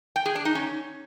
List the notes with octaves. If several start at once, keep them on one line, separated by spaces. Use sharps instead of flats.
G5
G#4
D4
D#4
C#4